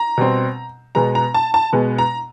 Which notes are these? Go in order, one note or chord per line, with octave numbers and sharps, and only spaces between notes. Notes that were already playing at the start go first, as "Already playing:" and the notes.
Already playing: A#5
B2 G3 C4
B2 G#3 B3 A#5
A#5
A5
A5
B2 G#3 B3
A#5